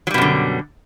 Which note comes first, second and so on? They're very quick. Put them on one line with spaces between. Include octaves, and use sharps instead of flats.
F#3 G3 B2 F#2 D3